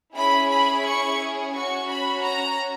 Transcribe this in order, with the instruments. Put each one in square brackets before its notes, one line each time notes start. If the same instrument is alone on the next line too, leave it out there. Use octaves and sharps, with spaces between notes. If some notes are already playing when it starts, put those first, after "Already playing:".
[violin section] C#4 E4 G#4 B5
B5
C#6
C#4 F#4 C#6
B5
A#5